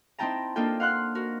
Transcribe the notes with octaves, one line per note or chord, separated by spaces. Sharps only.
C4 D#4 E4 G5 A5 A#5
A#3 D4 D#4 F4 A4 G5
F5 F#5 C6 F6 F#6
F#4 A#4